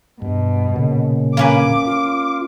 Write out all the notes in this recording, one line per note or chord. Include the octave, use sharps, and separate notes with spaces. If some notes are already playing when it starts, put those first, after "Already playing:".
G2 B2
A#2 C#3
A#3 C#4 B4 D6
F4